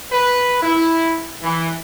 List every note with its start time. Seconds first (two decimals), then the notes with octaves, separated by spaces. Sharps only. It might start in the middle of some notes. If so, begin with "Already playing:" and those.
0.12 B4
0.62 E4
1.42 E3